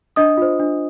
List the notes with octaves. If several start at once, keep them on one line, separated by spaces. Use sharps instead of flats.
D4 D#5 D#6
F4 C5
D4